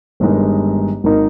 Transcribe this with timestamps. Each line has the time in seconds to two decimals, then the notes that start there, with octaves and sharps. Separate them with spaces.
0.20 G1 G2 D#3 G#3 D#4
1.04 G#1 D#3 A#3 D#4